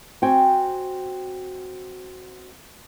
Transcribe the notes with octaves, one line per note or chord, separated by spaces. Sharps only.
C4 F#4 G5 G#5